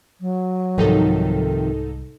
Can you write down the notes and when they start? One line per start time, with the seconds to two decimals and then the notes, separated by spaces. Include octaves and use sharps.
0.20 F#3
0.78 C2 G#2 C3 D#3 F3 D#4 A4